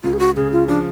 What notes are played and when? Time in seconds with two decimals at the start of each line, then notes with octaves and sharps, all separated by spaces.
0.04 C#2 F4
0.13 G#4
0.19 F#4
0.37 C#3 G#4
0.52 F4
0.68 F3 D4